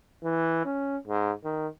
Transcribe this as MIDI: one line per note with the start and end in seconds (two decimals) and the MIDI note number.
0.24 0.63 52
0.65 0.98 61
1.07 1.32 44
1.44 1.67 51